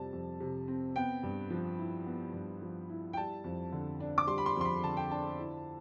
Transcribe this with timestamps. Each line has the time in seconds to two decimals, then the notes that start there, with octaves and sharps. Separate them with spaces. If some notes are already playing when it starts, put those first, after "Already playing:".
Already playing: F2 C3 G3 C4 A5
0.13 F2
0.40 C3
0.68 C4
0.96 B3 G5
1.23 G2
1.50 F3
1.78 E4
2.06 B3
2.34 G2
2.62 F3
2.89 E4
3.13 G5
3.17 G3 A5
3.44 F2
3.72 D3
4.00 D4
4.18 D6
4.27 G3 C6
4.38 B5
4.46 C6
4.56 F2 C6
4.65 B5
4.83 D3 A5
4.97 G5
5.11 D4 A5
5.39 E4